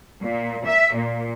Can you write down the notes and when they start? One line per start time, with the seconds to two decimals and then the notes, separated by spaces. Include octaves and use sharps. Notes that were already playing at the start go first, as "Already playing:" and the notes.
0.22 A#2
0.66 E5
0.95 A#2